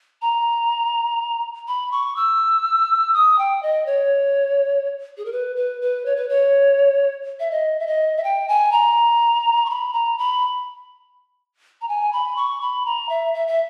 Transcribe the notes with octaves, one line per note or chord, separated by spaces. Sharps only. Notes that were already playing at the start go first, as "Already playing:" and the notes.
A#5
B5
C#6
E6
D#6
G5
D#5
C#5
G#4
A#4
B4
B4
B4
C#5
B4
C#5
E5
D#5
E5
D#5
E5
G5
G#5
A#5
C#6
B5
A#5
B5
A#5
G#5
B5
C#6
B5
A#5
E5
E5
E5